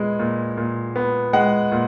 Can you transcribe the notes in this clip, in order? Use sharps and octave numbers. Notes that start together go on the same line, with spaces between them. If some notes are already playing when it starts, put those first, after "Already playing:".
Already playing: A#2 G#3 B3
A#2
A#2
B3
G#3 F#5
A#2